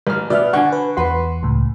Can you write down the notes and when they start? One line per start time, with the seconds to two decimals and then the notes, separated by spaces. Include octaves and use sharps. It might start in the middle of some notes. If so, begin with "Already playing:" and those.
0.07 A1 F6
0.30 B2 D5 E5 F6
0.53 D3 F#4 F#5 G#5 C#6
0.72 B4
0.97 E2 F#4 B4 C6
1.43 C#2 A2